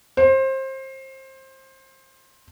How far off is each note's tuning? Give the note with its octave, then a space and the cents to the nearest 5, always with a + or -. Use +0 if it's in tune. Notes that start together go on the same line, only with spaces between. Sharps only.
C5 +25